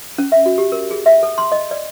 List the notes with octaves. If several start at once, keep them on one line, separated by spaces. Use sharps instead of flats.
C#4
E5
F#4
G4
A#4
G#4
E5
A4
C6
D#5
D5